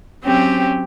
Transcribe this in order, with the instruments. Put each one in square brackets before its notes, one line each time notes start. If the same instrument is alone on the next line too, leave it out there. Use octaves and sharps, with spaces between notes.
[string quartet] F#3 C4 C#4 G4